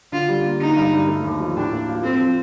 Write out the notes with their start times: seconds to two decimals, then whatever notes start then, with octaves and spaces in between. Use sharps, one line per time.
0.12 D3 F4
0.28 G3
0.45 A#3
0.60 D3 D#4
0.76 G2
0.93 G2
1.08 A3
1.24 D#2
1.40 F3
1.57 A2 D4
1.72 A#3
1.88 F4
2.03 C4 A4
2.19 F3